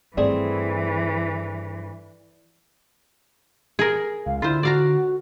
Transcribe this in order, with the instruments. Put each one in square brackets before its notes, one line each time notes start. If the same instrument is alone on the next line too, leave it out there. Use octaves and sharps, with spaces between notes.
[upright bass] G2 D#3 [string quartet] E3 [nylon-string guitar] A3 C4 G#4 [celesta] D5
[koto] G#4 A#4
[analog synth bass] C#2 [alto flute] F5
[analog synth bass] D3 [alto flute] E4 [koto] F4 C5
[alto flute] F#4 [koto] D5 F5 A#5